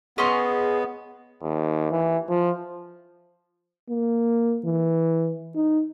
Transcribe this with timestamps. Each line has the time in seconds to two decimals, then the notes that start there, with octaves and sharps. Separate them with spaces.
0.18 B3 C#4 G#4 D#5 C6
1.42 D#2
1.91 E3
2.29 F3
3.89 A#3
4.65 E3
5.56 D#4